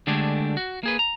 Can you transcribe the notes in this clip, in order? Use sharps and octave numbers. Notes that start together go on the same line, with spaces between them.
D3 G#3 A3 D4 G4 G#4
F#4
A#3 G#4 B4
A#5